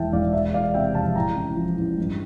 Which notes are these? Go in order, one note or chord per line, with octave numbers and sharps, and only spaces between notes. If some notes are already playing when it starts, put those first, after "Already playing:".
Already playing: E1 E2 E3 E5 G5 A5
E1 D5 F5
E2 E5
E3 D5 F5
C3 E5 G5
F1 F5 A5
A2 G5 A#5
A1
F3
A1
G2